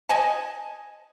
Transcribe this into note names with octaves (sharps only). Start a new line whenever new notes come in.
D#5 G#5 A5